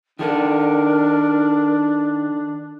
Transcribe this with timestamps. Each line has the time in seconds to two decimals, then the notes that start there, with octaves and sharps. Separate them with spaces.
0.19 D#3 D4 A4 A#4